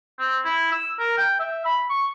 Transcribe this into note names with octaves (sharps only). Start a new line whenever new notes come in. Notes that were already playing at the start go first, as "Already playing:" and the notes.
C4
E4
E6
A#4
G5
E5
B5
C#6